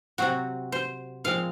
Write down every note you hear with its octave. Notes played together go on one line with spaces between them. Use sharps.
C3 F#3 C4 F#4
C5
A#2 F3 G#3 C4 F5